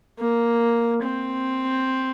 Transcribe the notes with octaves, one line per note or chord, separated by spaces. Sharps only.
A#3
C4